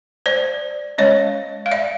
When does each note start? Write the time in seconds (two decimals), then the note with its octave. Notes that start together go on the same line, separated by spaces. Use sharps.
0.26 C5 D5
0.98 G#3 C#4 C#5 D#5
1.66 F5
1.71 D5 E5